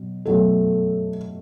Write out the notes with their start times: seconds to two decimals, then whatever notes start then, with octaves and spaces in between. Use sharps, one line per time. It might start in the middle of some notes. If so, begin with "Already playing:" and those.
Already playing: B2 F#3
0.25 B2 F#3 A3 A4